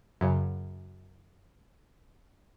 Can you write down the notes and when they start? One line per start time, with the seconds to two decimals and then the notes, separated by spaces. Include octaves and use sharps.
0.21 F#2 C#3